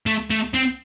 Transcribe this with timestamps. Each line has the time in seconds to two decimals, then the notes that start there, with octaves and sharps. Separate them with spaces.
0.06 A3
0.30 A3
0.54 C4